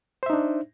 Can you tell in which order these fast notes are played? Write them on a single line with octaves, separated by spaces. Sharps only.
C5 E5 D#4 D4